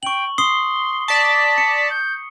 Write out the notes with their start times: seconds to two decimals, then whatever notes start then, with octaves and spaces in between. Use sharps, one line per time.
0.03 G5 C#6 F#7
0.38 C6 D#6 C7 G7
1.08 D5 A5 B6
1.58 C#7
1.90 G6